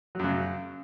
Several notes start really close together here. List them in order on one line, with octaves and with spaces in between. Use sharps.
F#3 F#2 C#3